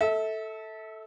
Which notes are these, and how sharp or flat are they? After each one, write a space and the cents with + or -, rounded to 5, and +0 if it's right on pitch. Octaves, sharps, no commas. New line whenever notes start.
A4 +0 E5 -30